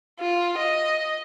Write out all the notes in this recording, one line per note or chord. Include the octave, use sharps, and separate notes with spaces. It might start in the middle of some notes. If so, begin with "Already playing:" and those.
F4
D#5